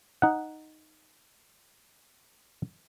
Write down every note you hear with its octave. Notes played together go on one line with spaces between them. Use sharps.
D#4 F#5